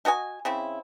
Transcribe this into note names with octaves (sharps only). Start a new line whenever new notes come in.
A3 F#4 D#5 G#5
C#3 C4 E4